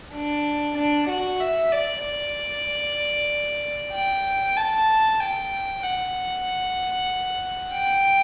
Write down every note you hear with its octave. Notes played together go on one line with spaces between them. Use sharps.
D4
D4
F#4
E5
D5
D5
G5
A5
G5
F#5
G5